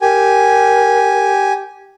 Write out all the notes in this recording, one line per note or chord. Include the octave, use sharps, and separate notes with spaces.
G4 A#4 G#5